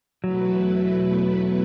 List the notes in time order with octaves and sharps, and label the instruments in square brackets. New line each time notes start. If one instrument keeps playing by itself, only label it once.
[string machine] E2 B2 A3 E4 B4 [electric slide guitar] F#3